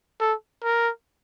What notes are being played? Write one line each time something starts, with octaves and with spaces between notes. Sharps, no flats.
A4
A#4